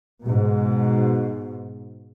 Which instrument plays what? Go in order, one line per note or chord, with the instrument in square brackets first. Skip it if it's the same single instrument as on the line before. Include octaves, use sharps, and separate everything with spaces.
[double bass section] G#2 B2